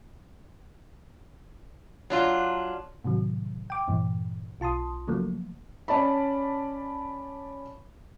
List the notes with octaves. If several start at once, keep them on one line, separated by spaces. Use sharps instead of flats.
F#3 D4 F4
A2 C3 D#3 F#3
G5 D6
E2 G2 A#2 E3
B1 F4 A5 C6 D#6
C#3 F3 F#3 A3 A#3
C#4 D5 A5 B5